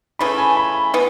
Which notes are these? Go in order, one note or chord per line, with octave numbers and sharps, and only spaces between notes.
C#3 E3 A3 B5
G#5
B5
E3 B3